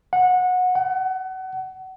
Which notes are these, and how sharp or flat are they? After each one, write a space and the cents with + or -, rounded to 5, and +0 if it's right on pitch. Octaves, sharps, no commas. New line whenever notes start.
F#5 -20
F#5 +30